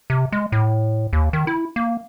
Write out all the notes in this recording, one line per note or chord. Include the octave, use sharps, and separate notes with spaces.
C3
G#3
A2
D#2
D#3
E4
A#3